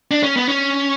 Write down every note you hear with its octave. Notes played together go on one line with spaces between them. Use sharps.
D4
C#4
B3
C#4